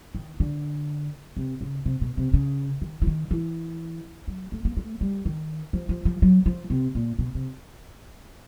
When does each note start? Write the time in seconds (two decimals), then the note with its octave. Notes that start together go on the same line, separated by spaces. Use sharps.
0.15 D#3
0.40 D3
1.37 C3
1.61 C#3
1.86 C3
2.01 B2
2.17 C3
2.34 C#3
2.81 D#3
3.02 E3
3.07 D#3
3.31 E3
4.28 F#3
4.52 A3
4.65 A#3
4.77 A3
5.01 G3
5.25 D#3
5.73 F3
5.89 F3
6.05 F3
6.22 F#3
6.46 F3
6.70 C3
6.95 A#2
7.19 B2
7.35 C3